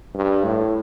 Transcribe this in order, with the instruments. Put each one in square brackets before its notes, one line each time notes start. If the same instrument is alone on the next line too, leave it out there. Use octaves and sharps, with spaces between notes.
[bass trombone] G2
A2